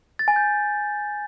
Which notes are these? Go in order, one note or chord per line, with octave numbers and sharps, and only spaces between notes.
A6
G#5
G6